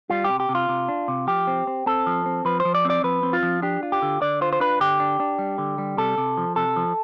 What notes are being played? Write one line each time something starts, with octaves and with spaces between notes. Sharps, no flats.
G3 F4
C3 G4
G4
C3
F4
C3
D4
C3
F3 G4
C4
C4
C4 A4
F3
C4
F3 B4
C5
F3
D5
C4 D5
F3 B4
C4
F4
F3
D4 G4
F4
G4
D3
D3 D5
F4 C5
C5
D4 B4
D3 G4
D4
D4
G3
D3
G3
C3 A4
C3
F3
C3 A4
F3